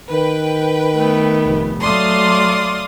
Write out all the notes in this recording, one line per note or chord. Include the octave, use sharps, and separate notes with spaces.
D#3 B4 G5
A3 B3
F1
F#3 A3 D5 F5 C6 D#6